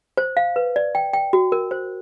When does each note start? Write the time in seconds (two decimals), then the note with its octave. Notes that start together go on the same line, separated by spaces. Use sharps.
0.17 C5
0.37 F5
0.56 B4
0.76 D5
0.95 G5
1.13 G5
1.33 F#4
1.52 A#4
1.71 C5